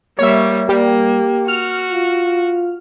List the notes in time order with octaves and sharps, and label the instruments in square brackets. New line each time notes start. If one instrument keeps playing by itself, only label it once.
[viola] G3 A#3 [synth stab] C#5 E5
[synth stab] G3 [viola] A#3 [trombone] G4
[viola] F#4 [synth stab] F6
[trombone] F4